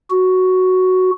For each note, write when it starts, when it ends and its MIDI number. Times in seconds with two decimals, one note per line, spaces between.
0.11 1.11 66